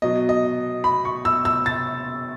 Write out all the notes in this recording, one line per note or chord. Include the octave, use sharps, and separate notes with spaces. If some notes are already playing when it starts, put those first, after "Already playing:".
B2 F#3 D#5
D#5
B5
C#6
E6
E6
A6